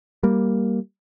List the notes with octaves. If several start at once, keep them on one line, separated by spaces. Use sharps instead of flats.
G3 A#3